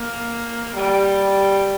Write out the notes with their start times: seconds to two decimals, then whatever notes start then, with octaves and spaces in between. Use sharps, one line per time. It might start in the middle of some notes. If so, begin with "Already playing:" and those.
Already playing: A#3
0.75 G3